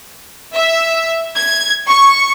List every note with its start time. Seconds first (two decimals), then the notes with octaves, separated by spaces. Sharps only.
0.55 E5
1.37 G#6
1.89 C#6